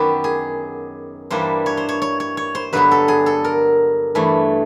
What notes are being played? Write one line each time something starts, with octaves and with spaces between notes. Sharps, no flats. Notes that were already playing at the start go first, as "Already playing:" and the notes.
Already playing: F#2 D#3 F#3 B3 G4
G#4
G2 E3 G3 A#3 D4 C5
C#5
C5
C#5
C#5
C#5
C#5
C5
G2 D3 F#3 B3 B4
A4
G#4
A4
A#4
G2 E3 A3